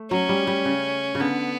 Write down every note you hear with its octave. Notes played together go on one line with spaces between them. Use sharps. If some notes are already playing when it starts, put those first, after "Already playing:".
Already playing: A3
F#3 C#4
G3
G3
C#3
C#3
D3 B3